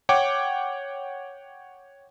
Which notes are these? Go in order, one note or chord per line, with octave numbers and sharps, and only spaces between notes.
C#5 F#5 G5 D6